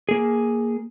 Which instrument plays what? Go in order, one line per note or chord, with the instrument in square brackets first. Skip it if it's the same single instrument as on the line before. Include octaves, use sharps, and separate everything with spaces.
[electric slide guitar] A#3 G#4